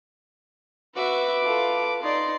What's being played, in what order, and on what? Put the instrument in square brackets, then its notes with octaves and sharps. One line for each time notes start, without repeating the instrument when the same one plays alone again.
[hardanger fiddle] F#4 E5 [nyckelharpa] B4 D6
[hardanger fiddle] F4 A4
[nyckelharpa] D#4 D5 [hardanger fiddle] C6